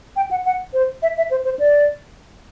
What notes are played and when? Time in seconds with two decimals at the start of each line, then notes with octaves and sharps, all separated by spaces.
0.16 G5
0.31 F#5
0.46 F#5
0.73 C5
1.02 E5
1.17 E5
1.31 C5
1.45 C5
1.59 D5